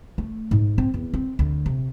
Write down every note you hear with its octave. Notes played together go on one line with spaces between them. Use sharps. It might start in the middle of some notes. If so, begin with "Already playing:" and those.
A3
G#2
C4
E2
C4
D2
C3